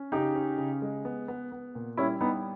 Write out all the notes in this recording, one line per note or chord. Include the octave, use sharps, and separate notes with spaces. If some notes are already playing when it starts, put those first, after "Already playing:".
Already playing: C#4
C#3 D#4 G4
C#4
C#3
G#3
B3
B3
B3
A#2
G3 C#4 E4
G3 B3 D#4